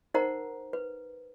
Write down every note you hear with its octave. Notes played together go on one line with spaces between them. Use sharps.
D#4 A#4 C5 F#5 A#5
B4